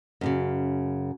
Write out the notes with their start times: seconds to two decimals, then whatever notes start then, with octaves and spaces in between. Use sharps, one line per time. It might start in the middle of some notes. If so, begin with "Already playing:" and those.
0.21 F#2 A2 C#3